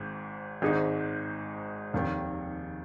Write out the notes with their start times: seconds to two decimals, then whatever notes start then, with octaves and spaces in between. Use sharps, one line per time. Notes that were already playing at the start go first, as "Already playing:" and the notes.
Already playing: G#1 G#2
0.62 G#1 G#2 G#3 D#4 G#4
1.93 F1 D#2 D#3